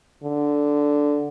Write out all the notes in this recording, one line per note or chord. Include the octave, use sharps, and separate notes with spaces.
D3